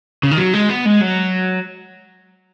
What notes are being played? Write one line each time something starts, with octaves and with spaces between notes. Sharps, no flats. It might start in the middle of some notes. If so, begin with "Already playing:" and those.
C#3
D#3
F#3
G#3
B3
G#3
F#3